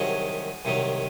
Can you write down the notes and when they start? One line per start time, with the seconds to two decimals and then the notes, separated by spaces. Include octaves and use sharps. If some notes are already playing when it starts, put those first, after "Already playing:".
Already playing: C2 C3 D#3 F#3 F#4 G#4
0.65 C2 C3 D#3 F#3